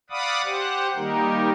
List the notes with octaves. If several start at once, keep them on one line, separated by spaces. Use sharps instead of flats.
D5 F5 F#5 B5 D6 D#6
G4 C5 F#5
D#3 G3 A#3 D#4 G4 A#4